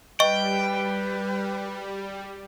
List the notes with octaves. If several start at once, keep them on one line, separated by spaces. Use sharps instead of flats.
G3 B4 D#5 G5 C#6